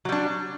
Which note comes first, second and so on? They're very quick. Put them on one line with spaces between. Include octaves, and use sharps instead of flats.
F#3 G3 D4